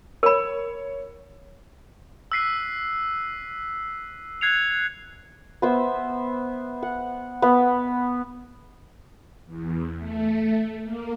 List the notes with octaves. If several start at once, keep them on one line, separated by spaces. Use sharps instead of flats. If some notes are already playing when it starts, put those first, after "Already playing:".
A#4 C#5 B5
E6 F#6 B6 C7 D#7
F#6 G#6 C7 C#7 F7
B3 C5 E5
F#5
B3
E2
A3
A#3